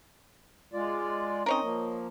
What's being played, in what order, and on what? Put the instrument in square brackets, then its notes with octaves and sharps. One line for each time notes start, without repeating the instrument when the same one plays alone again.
[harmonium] G#3 F4 D5
[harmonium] C4 C#4 D#4 [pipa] A#4 C#5 D#5
[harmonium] F3 A#3